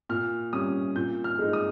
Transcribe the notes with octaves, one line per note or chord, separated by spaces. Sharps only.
A#2 F6
G3 C#4 D#6
A#2 G6
F6
G#3 D#4
D#6